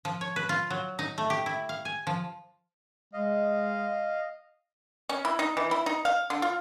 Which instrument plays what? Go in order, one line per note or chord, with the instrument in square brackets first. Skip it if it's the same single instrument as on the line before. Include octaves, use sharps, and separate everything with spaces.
[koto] F3
C#5
B4
F4
F#3
D#4
A3
G4
E4
F5
G#5
F3
[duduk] G#3 [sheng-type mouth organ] D#5 F5
[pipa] C#4
E4
D#4
E3
E4
D#4
F5
D3
F4